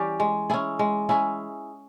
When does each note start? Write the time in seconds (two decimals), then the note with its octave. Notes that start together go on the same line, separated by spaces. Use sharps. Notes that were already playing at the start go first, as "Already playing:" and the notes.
Already playing: E3 G3 C#4 G4
0.20 G#3
0.50 C#4 E4 G#4
0.79 G#3
1.09 C#4 E4 G#4